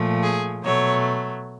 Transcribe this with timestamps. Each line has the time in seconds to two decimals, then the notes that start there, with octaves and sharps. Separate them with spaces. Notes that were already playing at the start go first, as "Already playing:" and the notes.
Already playing: A#2 F3 A3
0.22 G#4
0.63 B2 F#3 A3 C#5